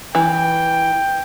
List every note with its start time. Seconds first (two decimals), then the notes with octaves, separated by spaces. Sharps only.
0.15 E3 G5